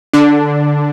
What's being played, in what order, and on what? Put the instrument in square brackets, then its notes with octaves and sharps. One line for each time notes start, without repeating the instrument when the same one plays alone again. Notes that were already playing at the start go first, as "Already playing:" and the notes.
[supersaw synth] D3 D4